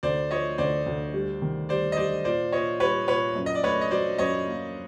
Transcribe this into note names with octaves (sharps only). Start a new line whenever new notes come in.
D2 C5 D5
F3 C#5 D#5
D2 C5 D5
D2
G3
D#3
G3 C5 D5
D#5
G3 C5 D5
A#2 C5 D5
A#2 C#5 D#5
G3 B4 C#5
A#2 B4 C#5
F#2
D#5
D5
A3 B4 C#5
D#5
F#3 C5 D5
F#2 C#5 D#5
A#3